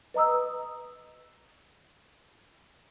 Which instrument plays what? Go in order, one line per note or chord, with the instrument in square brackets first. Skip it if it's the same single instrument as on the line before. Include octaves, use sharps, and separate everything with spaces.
[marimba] B4 D#5 A#5 D#6 E6